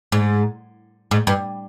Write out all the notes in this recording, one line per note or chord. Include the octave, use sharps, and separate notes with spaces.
G#2
G#2
G2